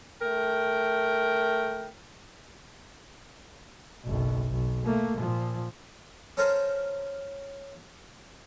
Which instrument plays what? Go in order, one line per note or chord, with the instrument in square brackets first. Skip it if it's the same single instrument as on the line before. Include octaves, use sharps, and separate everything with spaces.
[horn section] A3 A#4 G5
[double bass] F#1 B1
B1
A3 A#3
A#2 F3
[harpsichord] C#4 A4 A#4 C5